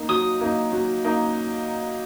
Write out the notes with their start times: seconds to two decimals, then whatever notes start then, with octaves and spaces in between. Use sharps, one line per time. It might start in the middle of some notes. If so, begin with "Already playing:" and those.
Already playing: A#3 D#4
0.09 F#3 D#6
0.41 A#3 D#4
0.72 F#3
1.05 A#3 D#4